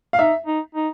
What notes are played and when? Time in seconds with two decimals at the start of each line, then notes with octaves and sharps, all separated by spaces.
0.13 F5
0.19 D#4 E5
0.46 D#4
0.75 D#4